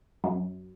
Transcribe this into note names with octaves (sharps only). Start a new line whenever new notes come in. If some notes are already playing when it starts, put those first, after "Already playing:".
F#2